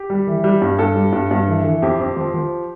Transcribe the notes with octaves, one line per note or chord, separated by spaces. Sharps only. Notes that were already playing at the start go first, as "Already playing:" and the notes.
Already playing: G4
G3
E3
G3
G2
G2 A4
G3
G2
G2
E3
E3
F2 G4
F2
F3
F3